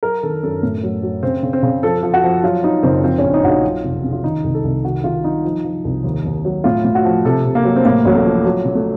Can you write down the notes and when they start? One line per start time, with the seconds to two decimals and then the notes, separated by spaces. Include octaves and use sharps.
0.03 F#3 A#4
0.23 D#3 A4
0.43 F#2 A4
0.63 A2
0.83 F#3
1.03 F#3
1.23 C#3 C4
1.43 C#3
1.53 C4
1.63 C#3
1.83 F3 A4
2.03 F3
2.14 F#4
2.24 F3
2.44 F#3 F4
2.64 F#3 D#4
2.83 F#1 C4
3.04 F3 C4
3.18 A#1 C#4
3.34 D#4
3.43 A#1 F#4
3.49 F4
3.64 F#3
3.84 F1
4.04 C#3
4.12 F4
4.24 D#3 D#4
4.44 C2
4.54 A4
4.64 C2
4.85 D#3 F#4
5.04 D#3 F4
5.24 F#3 D#4
5.45 F3
5.64 F3
5.85 C2
6.04 D#2
6.25 D#2
6.45 F#3
6.64 A2 F4
6.85 A2
6.95 F#4
7.05 F3
7.25 C3 A4
7.45 C3
7.55 A#3
7.65 F#3
7.76 C4
7.85 A2 A#3
8.05 A1 F#3
8.15 A3
8.25 F3
8.45 F#3
8.65 C#3
8.75 A3